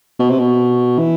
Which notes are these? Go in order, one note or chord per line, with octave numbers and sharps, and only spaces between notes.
B2
C3
B2
E3